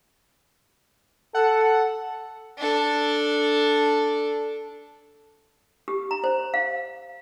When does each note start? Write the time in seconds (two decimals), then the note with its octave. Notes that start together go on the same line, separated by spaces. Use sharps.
1.35 A4 F#5
2.57 D4 A4
5.88 G4
6.11 A#5
6.24 C5
6.54 F5